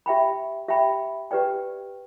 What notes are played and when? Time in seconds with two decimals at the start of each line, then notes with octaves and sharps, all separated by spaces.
0.06 G4 E5 G5 B5
0.68 G4 E5 G5 B5
1.31 G4 B4 D5 G5